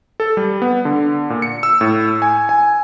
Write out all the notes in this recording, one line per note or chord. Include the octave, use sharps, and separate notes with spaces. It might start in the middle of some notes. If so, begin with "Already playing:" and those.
A4
G3
B3
D3
A#2
C#7
E6
A2
G#5
G#5